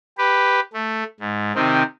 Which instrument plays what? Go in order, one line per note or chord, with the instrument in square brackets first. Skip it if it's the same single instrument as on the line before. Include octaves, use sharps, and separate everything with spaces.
[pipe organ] G4 B4
A3
G#2
C3 D#3 C4